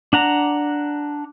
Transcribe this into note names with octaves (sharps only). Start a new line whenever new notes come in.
D4 F#5 A#5